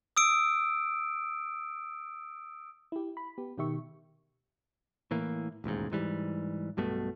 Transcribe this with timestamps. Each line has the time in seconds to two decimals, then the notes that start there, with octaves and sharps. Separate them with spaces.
0.17 D#6 E6 D7
2.92 E4 G4
3.17 B5
3.38 B3 G4
3.58 B2 D#3 G4 E5 C#6
5.11 A2 E3 A#3
5.64 E1 A1 D#2 G#2
5.92 G#2 E3 G3
6.77 B1 G2 B2 A3